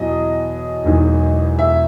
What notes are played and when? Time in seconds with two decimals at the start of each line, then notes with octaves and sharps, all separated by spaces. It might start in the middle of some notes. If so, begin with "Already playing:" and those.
Already playing: E2 B2 F#3 D#5
0.84 E1 E2 D#3 F#3
1.59 E5